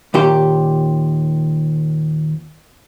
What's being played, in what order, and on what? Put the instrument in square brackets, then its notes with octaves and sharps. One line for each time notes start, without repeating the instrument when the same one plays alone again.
[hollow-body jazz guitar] D#2 A#2 G4